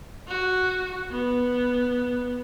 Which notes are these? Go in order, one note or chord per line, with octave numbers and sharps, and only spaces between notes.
F#4
B3